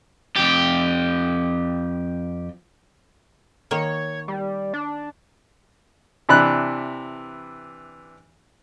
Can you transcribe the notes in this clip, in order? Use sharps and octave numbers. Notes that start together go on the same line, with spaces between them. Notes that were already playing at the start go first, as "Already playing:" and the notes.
F2 G4
D#3 A#3 C#5
G3
D4
C3 E3 D4 B5 F#6